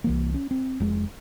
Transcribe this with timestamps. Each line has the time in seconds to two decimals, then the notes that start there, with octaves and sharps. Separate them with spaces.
0.04 C2 E3 A#3
0.34 C#4
0.51 C4
0.80 F1 G#3